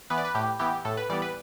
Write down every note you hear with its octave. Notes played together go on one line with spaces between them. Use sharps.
E3 B3 B4
D5
B4
A2 G4
E3 B3 G4
A2 A4
B4
E3 G3 B3 D5
B4